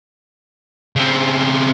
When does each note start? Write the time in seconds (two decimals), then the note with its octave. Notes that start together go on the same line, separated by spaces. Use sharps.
0.96 C#3 C4